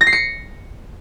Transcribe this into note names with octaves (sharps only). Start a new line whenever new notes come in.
A#6
C7
C#7